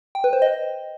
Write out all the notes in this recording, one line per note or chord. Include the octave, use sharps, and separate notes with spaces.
G5
B4
C5
D#5